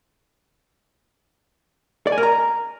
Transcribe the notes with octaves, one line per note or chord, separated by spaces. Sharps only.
D5
G#5
A#4
A#5